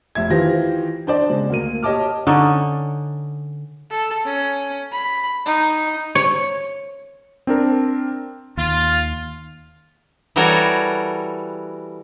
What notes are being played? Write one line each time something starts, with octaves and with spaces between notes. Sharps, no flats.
F1 E5 G#6
D#3 E3 F4 G4 C5 A#6
D4 C5 D5
C#3 G#3
D2 A#3 A#4 D#7
G4 C#5 D#5 A5 D6 F6
D3 C#4 D#4
A4
C#4
B5
D#4
C#5
C4 D4 A#4
D#2 F4
E3 G3 F#4 A4 A#4 C#5